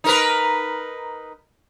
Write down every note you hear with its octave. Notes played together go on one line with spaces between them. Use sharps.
D#4 A#4 B4